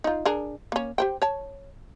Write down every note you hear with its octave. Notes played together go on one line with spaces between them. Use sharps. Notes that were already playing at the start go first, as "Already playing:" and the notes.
D#4 F4
D4 G#4 A#4
A#3 C#4
G4 C5 G5
C#5 A5